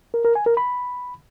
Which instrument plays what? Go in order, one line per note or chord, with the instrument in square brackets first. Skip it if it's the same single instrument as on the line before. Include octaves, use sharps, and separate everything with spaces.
[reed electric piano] A#4
A#4
G#5
A#4
B5